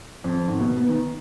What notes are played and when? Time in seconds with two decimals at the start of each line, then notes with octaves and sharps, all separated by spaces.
0.24 F2
0.47 G#1
0.60 B2
0.77 B3
0.89 D#3